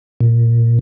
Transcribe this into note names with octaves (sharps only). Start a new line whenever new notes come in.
A#2